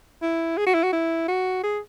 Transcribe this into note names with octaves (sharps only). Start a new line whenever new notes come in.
E4
G#4
F#4
E4
F#4
E4
F#4
G#4